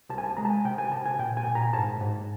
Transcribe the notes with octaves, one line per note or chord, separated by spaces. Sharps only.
C2 A5
G#5
A5
G#3 A#5
A5
G#5
C3 G5
G#5
C3 A5
G#5
A#2 G5
G#5
A#2
A#5
G#2 A5
G#2